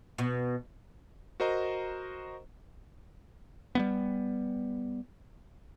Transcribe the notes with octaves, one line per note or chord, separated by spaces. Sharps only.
B2
F#4 A#4 C5 D#5 A#5
G3 A#3 B3